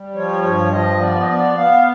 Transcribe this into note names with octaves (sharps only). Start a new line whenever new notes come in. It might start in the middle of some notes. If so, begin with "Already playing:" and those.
Already playing: G3
F3 C#5
G2 C#5
F3 D#5
B3 D5
D#5
B3 D5
B3 F5